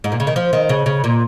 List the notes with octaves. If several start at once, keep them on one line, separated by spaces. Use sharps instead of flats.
G#2
A#2
C#3
D#3
F3
D#3
C#3
C#3
A#2